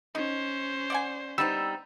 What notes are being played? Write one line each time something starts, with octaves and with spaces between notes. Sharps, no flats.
C#4 D#4 C5
D5 F#5 G#5
G3 B3 C4 D#4 E6